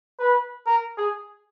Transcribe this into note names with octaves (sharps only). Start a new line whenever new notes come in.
B4
A#4
G#4